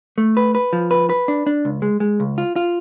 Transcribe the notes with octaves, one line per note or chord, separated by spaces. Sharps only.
A3
B4
B4
F3
B4
B4
D4
D4
C#2
G#3
G#3
C#2
F4
F4